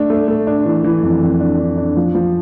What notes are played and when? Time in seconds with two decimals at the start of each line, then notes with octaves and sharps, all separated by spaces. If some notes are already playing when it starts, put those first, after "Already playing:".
Already playing: A3 D4
0.10 A3
0.28 A3
0.47 D4
0.66 E3
0.84 E3
1.03 F2
1.22 F2
1.40 D4
1.59 D4
1.78 D4
1.97 F3
2.15 F3